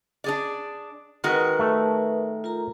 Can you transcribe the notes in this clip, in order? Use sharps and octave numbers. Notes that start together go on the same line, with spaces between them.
D4 G#4 D5
D#3 G#3 F#4 A#4 B4
A3
F4 A#4 A#5